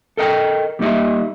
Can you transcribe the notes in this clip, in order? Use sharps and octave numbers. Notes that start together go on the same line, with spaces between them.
A4 A#4 D#5 G5
G3 A#3 D#4 G4 D#5 E5